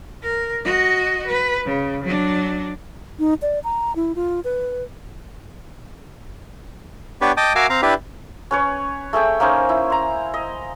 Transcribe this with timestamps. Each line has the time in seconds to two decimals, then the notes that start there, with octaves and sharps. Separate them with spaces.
0.23 A#4
0.65 F#4 D#5
1.27 B4
1.65 C#3
2.03 F#3 D4
3.19 D#4
3.42 D5
3.64 A#5
3.96 E4
4.16 F4
4.44 B4
7.21 B3 D4 G4 B4 C#5
7.37 D#5 G5 A5 D6 D#6
7.55 F#4 A#4 E5 F5 G#5 D6
7.70 C4 F5 A#5
7.82 D4 E4 G4 B4
8.51 C#4 B4 C#5
9.13 A3 G#4 E5 G5
9.40 A#3 C#4 D#4 C5
9.69 E4
9.90 A#5 C6
10.34 D#5